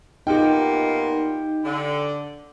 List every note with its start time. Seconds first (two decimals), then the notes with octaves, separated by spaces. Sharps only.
0.27 A#2 B3 D#4 F4 G4 G5
1.65 D3